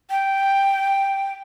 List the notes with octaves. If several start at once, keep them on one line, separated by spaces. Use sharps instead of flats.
G5